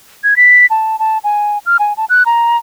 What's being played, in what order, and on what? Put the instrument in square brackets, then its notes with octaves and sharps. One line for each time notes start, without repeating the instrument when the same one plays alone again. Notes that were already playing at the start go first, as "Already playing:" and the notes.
[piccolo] G#6
B6
A5
A5
G#5
F6
G#5
A5
F#6
A#5